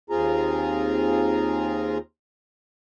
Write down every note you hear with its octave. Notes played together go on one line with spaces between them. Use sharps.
D#2 C4 F4 G#4 A#5